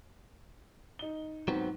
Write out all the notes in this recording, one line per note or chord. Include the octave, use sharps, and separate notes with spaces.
D#4 G7
G#2 F#3 B3 C4